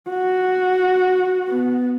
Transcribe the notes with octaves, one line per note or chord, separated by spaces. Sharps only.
F#4
B3